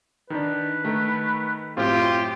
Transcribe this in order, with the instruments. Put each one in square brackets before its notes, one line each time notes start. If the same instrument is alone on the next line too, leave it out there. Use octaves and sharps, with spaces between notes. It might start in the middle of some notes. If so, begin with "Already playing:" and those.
[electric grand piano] D#3 D4 [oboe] B4
[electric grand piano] D#3 A3
[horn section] F#2 F4 G4 [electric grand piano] A2 C4